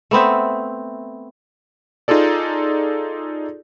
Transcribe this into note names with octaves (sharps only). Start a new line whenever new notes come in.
A3 B3 C4 E5
D#4 F4 G#4 A4 D5